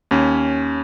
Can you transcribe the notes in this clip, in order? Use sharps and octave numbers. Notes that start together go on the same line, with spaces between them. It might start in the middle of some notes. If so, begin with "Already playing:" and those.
D#2 C#4